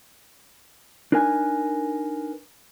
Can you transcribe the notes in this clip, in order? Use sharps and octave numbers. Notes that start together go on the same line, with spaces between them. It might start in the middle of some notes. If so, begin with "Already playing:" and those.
D4 D#4 A#4 B4 G#5